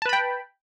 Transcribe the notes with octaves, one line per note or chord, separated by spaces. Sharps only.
B4 G5 A5 B5